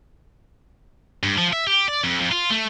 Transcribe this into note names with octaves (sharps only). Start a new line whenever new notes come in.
G2
F3
E5
G4
D5
F2
F2
F4
A3